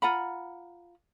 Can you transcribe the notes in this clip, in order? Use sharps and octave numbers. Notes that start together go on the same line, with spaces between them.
F4 F#5 A#5 B5